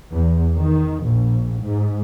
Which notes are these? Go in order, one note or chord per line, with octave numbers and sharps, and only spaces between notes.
E2
D#3
A#1
G#2